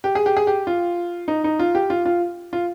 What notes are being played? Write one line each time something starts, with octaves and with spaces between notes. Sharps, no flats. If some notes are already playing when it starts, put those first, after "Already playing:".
G4
G#4
G4
G#4
G4
F4
D#4
D#4
F4
G4
F4
F4
F4